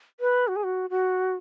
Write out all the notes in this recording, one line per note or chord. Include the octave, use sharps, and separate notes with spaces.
B4
F#4
G#4
F#4
F#4